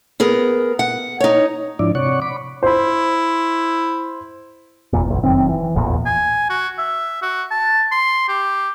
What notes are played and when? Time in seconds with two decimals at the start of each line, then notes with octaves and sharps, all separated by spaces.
0.20 B3 G#4 A#4
0.79 F#5
1.20 D#4 C#5
1.79 G#2 F3 D4 E4 D5
1.95 C3 C#5 D5 F#5 C#6
2.22 B5 D6
2.63 E4 C5 B5
4.93 F1 E2 A#2
5.06 F#1 B1
5.23 F1 F#2 D#3 C4
5.49 E3
5.75 D#1 A1 E2 A#2
6.06 G#5
6.50 F#4
6.78 E5
7.22 F#4
7.51 A5
7.92 C6
8.28 G4